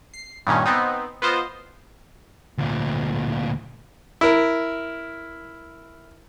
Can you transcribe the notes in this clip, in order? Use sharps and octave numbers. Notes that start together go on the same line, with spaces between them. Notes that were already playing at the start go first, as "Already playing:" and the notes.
C7
G2 A#2 D#3 C#4
B3 C4 D#4
B3 F4 C5 D#5
D2 A#2
E4 A#4